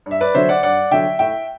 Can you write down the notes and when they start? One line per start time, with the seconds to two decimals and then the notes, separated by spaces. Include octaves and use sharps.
0.06 G2
0.11 E5
0.21 B4 D5
0.34 D3 F#3 C5 E5
0.49 D5 F#5
0.63 G2 D5 F#5
0.91 D3 F#3 E5 G5
1.19 A2 E5 G5